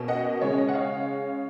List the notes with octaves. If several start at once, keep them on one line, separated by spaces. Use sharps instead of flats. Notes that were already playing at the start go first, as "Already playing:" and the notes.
Already playing: B2 A#3 C#4
D#5 F#5
D#5
C#3 G#3 C#4 C#5
D#5
F#5
C#5 F5